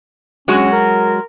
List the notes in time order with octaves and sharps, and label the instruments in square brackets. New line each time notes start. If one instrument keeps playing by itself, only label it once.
[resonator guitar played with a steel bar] F#3 G#3 F#4 [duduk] C#4
[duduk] A#4